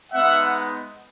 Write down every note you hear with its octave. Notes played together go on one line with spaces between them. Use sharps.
G#3 B3 D#4 E5 F#5